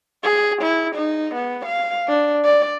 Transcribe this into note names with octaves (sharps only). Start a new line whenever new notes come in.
G#4
E4
D#4
B3
F5
D4
D5